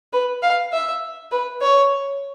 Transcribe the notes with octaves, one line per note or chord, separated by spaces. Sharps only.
B4
F5
E5
B4
C#5